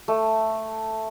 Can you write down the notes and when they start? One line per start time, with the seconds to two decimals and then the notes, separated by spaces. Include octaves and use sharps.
0.08 A3